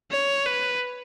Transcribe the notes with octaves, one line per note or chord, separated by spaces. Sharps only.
C#5
B4